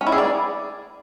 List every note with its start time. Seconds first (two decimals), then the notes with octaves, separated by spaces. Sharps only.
0.01 C#4
0.07 E4
0.12 G#4
0.18 D5